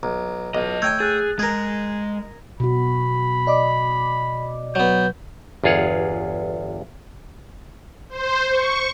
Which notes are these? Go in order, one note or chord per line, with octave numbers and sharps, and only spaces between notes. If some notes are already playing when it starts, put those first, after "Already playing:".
B1 A#5
B1 F4 D#5
A3 C#5 G5 G#5 E6 G6
G#4 F#6 A6
G#3 G#4 A#4
B2 F#4 B5
D5 D#5 D6
F#3 B3 G6
G1 E2 F4 G#4 C#5 F#5
C5
C#6